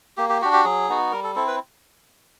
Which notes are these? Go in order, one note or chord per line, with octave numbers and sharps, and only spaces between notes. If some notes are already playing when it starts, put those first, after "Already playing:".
A#3 G4
G4
D4 F#4 G4
G4
F#3 G#4
B3 D#4 F#4
G3 A#4
A4
C4 E4 A4
B4